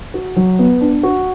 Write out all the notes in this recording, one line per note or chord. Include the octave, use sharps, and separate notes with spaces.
F#4
F#3
B3
D4
F#4